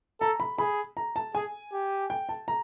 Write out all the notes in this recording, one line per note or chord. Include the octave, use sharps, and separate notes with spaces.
A4 A#5
B5
G#4 B5
A#5
A5
G#4 G#5
G4
G5
A5
A#5